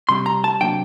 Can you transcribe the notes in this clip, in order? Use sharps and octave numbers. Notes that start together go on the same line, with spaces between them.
C3 G3 C4 C6
A#5
A5
C3 F#3 A#3 D4 G5